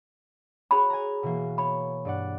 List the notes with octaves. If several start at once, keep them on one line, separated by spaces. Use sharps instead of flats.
F#4 G#4 C#5 B5
G#5 A#5
B2 E3 A#3
C#5 B5
G2 D5 F#5